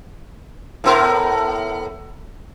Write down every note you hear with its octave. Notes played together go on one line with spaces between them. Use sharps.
A2 B3 A#4